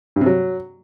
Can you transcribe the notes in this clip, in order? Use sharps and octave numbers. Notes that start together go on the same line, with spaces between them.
G2
C3
F#3